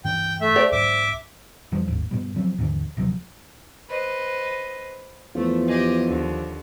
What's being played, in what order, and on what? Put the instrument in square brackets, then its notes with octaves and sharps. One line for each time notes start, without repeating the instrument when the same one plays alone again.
[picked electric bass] G2 C#3 E3 [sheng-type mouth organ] G5
[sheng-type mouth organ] A3 E5
[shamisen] C5 D5 G5
[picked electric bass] B1 G#2 [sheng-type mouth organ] E5 D6
[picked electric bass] F2 E3 F3 G3
D1 G1 D#2 G#2
G2 B2 G3
C#3 F3 F#3 C4
D#2 G#2 D3 E3
D#1 C3 F3 F#3
[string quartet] B4 C5 D#5
[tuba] E2 [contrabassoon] F3 [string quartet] A3
[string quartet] G4 G#4 D#5
D#2 D3